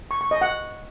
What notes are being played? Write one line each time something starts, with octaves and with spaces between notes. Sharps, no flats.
C#6
C#6
D#5
F#5